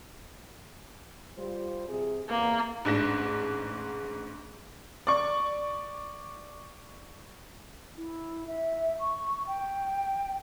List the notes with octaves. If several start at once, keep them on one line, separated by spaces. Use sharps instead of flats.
G3 F4 C5
C3 G#4
E2 A#3
A1 G#2 D4 A#6 E7
D5 C#6
E4
E5
C#6
G5